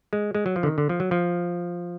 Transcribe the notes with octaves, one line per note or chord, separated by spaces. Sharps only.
G#3
G#3
F#3
F3
D3
D#3
D3
F3
F#3
F3